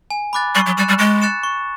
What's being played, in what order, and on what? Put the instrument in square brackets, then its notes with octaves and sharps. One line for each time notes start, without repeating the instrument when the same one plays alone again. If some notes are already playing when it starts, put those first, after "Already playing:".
[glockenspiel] G#5
B5 D6 F#6 A6
[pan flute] G3 [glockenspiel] C#6
[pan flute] F#3
[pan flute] G3 [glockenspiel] F#6 A6 C#7 E7
[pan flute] G3
[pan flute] G#3 [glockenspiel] C#6
[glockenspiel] F#6 A6 C#7 E7
C#6